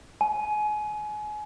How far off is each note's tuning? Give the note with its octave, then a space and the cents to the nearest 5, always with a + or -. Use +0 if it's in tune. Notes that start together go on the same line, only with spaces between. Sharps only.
G#5 +30